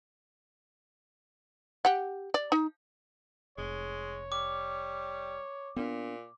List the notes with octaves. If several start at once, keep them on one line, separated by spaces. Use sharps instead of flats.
G4 F#5
D5
D#4
F1 G#3 C#5
G3 D6
A#2 B3 D4